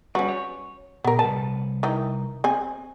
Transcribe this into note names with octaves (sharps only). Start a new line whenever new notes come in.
G3 C#4 F#4 B4
C#5
A#2 B3 A#4
C2 B4 A5
D#3 E3 D#4
C4 G#5